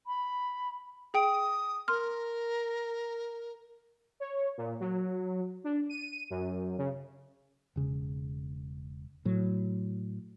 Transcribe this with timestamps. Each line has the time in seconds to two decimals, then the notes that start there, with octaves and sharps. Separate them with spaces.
0.07 B5
1.14 G#4 G5 D#6 D7
1.88 A#4 C6 F6
4.20 C#5
4.57 A#2
4.80 F#3
5.64 D4
5.89 D#7
6.30 F#2
6.78 C#3
7.76 E1 C#3
9.25 A2 F#3